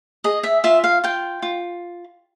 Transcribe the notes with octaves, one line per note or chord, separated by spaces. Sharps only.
G#4 D#5
E5
F4 E5
F5
F4 G5
F4